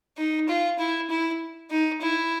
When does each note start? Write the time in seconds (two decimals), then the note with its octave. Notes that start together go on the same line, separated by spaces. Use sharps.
0.18 D#4
0.48 F4
0.79 E4
1.10 E4
1.71 D#4
2.01 E4